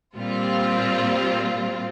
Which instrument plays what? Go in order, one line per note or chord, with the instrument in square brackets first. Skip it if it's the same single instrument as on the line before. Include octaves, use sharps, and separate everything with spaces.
[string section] A#2 G3 C4 F4